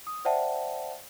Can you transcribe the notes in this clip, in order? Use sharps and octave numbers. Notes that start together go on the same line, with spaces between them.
D#6
C5 D5 E5 F#5 G5 A5